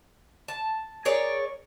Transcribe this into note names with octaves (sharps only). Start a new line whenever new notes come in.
A5
G#4 A#4 C#5 D5